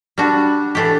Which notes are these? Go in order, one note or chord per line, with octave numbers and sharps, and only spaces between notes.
G3 D4 F#4
A2 E3 A3 D4 G4